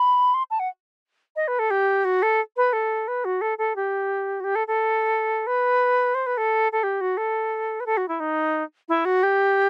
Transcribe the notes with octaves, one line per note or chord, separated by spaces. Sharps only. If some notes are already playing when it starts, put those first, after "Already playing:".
Already playing: B5
C6
A5
F#5
D#5
B4
A4
G4
F#4
A4
B4
A4
B4
F#4
A4
A4
G4
F#4
G4
A4
A4
B4
C5
B4
A4
A4
G4
F#4
A4
B4
A4
F#4
E4
D#4
E4
F#4
G4